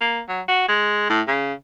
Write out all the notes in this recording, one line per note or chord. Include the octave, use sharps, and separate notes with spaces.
A#3
F#3
F#4
G#3
A2
C#3